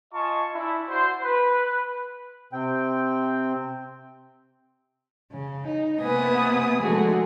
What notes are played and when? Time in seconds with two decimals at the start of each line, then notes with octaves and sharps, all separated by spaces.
0.13 F4 D#5 G#5 A5 C#6
0.53 D4 E4
0.88 D4 F#4 C5
1.22 B4
2.53 C3 C4 G5
5.31 C#3
5.67 D#4
6.01 C3 A#3 B3 B4 G#5 D#6
6.80 D3 F3 G#3 A3 F#4 G#4